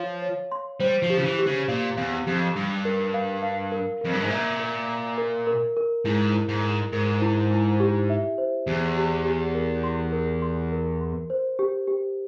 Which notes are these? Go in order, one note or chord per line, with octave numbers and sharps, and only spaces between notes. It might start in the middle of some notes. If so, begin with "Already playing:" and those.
Already playing: F3 C#5 F5
C#5
C6
G3 C5
F3
G4
C#3
E3
G4
C#3
A#2 F5
E2 F5
F2 G4
G2 F5
A#4
F5
F5
A#4
F2 A#4
G2
G#2
A#2 E5
A#4
A#4
A#4
A#4
A#4
G#2 E4
E4
G#2
A#4
G#2 A#4
E4
E4
G4
E5
C5
E2 G4
G4
G4
A#4
C6
A#4
C6
A#4
C6
C5
G4
G4